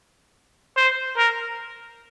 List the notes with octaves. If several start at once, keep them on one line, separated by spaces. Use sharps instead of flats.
C5
A#4